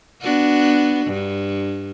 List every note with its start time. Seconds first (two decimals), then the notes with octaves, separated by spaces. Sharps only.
0.22 B3 D4 F#4
1.07 G2